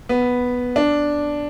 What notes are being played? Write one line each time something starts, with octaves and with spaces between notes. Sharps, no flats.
B3
D4